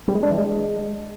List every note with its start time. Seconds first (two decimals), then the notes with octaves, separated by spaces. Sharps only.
0.08 G3
0.15 G#3
0.23 D4
0.30 E3
0.38 G#3